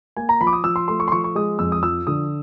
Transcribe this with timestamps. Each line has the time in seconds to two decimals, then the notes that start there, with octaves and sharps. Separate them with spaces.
0.17 A#3 G#5
0.29 A#5
0.41 F3 B5
0.47 D6
0.53 D#6
0.64 F3 E6
0.76 C6
0.88 A3 C6
1.00 C#6
1.08 C6
1.12 F3 C#6
1.24 C#6
1.35 G#3 D#6
1.59 F2 E6
1.72 D#6
1.83 F3 E6
2.07 D3 D#6